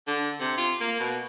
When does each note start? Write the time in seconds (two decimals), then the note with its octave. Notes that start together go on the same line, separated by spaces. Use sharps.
0.07 D3
0.40 C3
0.58 F4
0.81 A#3
1.00 B2